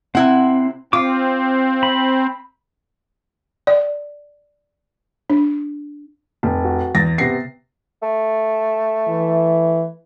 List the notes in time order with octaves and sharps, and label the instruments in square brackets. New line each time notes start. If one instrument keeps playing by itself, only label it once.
[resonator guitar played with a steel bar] C3 E4 F#5 [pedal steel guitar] C4
[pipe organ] C4 [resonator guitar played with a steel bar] F4 [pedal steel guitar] F5 D6
[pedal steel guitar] B5
[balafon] D5
D4
[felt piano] F1
[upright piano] F#4
[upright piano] E2 A6 [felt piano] A#6
[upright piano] C3 B3 A#6 [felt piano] C7
[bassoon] A3
[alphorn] E3